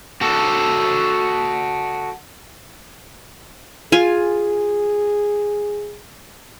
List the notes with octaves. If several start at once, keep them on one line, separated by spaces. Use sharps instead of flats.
F#4 A4
F4 G#4 G#5